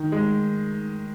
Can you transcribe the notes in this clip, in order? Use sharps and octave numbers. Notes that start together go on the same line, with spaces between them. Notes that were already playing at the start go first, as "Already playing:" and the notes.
Already playing: D#3
G#3